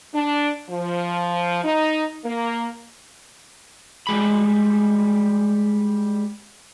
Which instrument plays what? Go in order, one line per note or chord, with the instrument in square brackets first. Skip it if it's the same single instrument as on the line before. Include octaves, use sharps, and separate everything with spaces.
[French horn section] D4
F3
D#4
A#3
[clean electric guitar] G3 G#3 B5